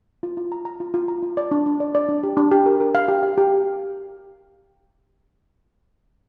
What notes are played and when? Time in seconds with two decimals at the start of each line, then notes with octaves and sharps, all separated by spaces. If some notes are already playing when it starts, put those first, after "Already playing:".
0.23 F4
0.37 F4
0.52 A#5
0.65 A#5
0.80 F4
0.94 F4
1.08 A#5
1.23 F4
1.37 D5
1.51 D4
1.66 D4
1.80 D5
1.95 D5
2.09 D4
2.23 G4
2.37 D4
2.51 G4
2.66 A#4
2.80 A#4
2.95 F5
3.08 G4
3.23 F5
3.38 G4